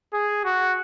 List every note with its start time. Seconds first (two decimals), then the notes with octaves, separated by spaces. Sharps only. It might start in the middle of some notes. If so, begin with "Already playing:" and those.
0.14 G#4
0.45 F#4